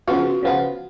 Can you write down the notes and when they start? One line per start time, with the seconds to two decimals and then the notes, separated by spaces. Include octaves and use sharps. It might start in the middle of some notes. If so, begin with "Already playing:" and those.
0.07 C#3 F3 B3 F4 F#4
0.43 C#3 F3 B3 F4